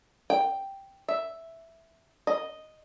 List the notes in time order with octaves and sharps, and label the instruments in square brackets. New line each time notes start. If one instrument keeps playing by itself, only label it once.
[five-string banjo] G5
E5
D#5